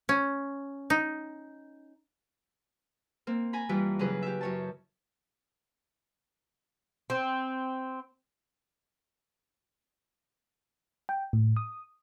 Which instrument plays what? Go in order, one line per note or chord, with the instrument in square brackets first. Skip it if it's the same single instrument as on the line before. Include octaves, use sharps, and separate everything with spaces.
[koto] C#4
D#4
[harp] A#3 C4
G#5 A#5 B5
G2 E3 G3 E4 F4
C#3 F#3 G#4 B4
G4 E5
F#2 C#5 A5
[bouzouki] C4
[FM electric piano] G5
A2
D#6